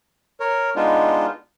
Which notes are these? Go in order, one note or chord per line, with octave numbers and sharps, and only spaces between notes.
A#4 C#5
G#3 B3 D4 D#4 F4